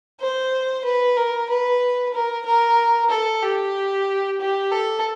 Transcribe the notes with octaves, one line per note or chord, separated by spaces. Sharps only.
C5
B4
A#4
B4
A#4
A#4
A4
G4
G4
A4